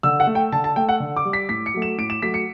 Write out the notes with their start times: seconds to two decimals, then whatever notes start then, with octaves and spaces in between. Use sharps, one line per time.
0.03 D3 E6
0.20 F#5
0.27 A3
0.35 G5
0.52 D3 A5
0.64 A5
0.76 A3 G5
0.89 F#5
1.00 D3
1.16 D6
1.25 G3
1.33 B6
1.49 A2 B6
1.66 C#7
1.74 F#3 A3
1.82 E7
1.98 A2 D7
2.10 E7
2.22 F#3 A3 B6
2.34 C#7